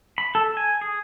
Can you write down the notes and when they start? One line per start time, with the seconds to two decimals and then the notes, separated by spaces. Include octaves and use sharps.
0.18 B5
0.35 A4
0.57 G#5
0.81 G#4